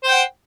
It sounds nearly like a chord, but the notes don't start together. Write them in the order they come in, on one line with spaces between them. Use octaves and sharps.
C5 G5 F#5